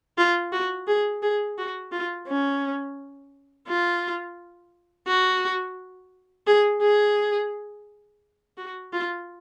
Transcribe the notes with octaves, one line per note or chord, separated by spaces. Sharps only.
F4
F#4
G#4
G#4
F#4
F4
C#4
F4
F#4
G#4
G#4
F#4
F4